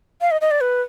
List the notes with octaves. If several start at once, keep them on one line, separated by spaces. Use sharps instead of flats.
F5
D#5
D#5
D5
B4